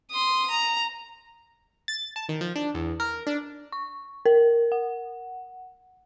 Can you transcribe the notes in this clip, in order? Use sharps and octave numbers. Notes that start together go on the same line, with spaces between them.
C6 D#6
A#5
A6
A5
D#3
F3
D4
E2
A#4
D4
C#6
A#4
F#5